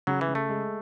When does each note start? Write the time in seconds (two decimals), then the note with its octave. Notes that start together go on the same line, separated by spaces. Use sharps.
0.07 C#3 F#3
0.21 E3
0.28 C#3
0.35 A3
0.49 G#3